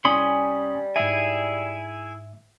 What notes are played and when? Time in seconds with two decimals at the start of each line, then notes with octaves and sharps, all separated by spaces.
0.05 C2 G3 C#4 G#5 B5 C6 D#6
0.96 G#2 E4 G#4 E5 G#5